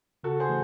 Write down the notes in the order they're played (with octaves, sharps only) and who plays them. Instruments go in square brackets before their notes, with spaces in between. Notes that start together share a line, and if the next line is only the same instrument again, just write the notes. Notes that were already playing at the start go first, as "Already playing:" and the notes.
[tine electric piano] C#3 [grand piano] F#4 A4
[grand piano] G#4 C5
[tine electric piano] E3 A3